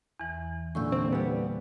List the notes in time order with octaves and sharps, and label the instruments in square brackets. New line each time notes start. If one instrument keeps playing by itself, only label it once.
[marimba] E2 E3
[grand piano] A#2 D3 E3 [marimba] C#6 E6 G6
[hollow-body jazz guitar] C4
G3 B3